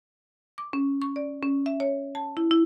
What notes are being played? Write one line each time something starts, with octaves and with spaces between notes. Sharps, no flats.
D6
C#4
C#6
D5
C#4
E5
C#5
A5
E4
E4